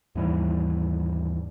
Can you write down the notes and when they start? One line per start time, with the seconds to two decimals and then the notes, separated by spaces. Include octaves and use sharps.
0.15 D#2 G#2 E3 G3